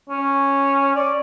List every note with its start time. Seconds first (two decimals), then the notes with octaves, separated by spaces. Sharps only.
0.10 C#4
0.95 D5